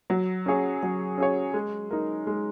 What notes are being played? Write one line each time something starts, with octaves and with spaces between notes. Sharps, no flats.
F#3
C#4 G#4 C#5
F#3
C#4 G#4 C#5
G#3
D#4 A#4
G#3